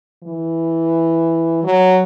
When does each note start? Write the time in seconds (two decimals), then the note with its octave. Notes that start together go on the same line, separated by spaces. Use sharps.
0.23 E3
1.64 F#3